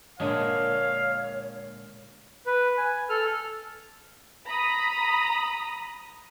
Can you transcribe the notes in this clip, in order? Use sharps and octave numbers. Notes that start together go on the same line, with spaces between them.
A#2 D3 G#3 C#5 F5
B4
G#5
A4 F6
A#5 B5 D#6